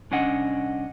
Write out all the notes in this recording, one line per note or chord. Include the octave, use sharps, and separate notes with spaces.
C2 C#4 D4 D#5 F#5